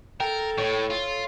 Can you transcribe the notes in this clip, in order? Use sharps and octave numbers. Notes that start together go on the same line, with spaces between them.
A4 A#4 G5
A2 C#5
F4